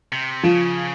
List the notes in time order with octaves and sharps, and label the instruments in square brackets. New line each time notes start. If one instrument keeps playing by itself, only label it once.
[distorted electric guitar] C3
[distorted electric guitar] C#3 [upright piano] F3